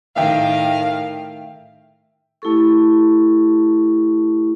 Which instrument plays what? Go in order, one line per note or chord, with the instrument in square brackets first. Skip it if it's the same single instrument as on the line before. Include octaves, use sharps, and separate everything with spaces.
[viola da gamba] A2 D#3 [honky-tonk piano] E5 G5 [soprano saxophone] F5
[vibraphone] A3 E4 G4 A4 C#6